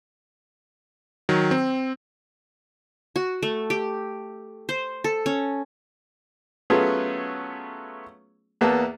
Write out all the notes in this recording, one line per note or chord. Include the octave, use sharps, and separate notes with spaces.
D#3 F#3
C4
F#4
A3
G4
C5
A4
C#4
F#3 A3 B3 C#4 F4 G#4
E2 A#3 B3 E5 A5